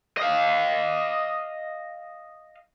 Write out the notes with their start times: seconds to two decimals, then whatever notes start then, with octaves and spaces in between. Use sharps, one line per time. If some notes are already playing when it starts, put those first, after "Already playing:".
0.17 D#5 F5